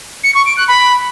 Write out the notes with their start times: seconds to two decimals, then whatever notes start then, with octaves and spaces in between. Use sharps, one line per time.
0.23 C#7
0.34 C#6
0.45 D7
0.57 F#6
0.68 B5